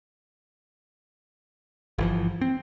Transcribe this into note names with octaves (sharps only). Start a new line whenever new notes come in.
G1 E3 F3
C4